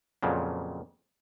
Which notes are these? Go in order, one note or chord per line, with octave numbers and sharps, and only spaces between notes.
F2 A#2 C#3 F3 F#3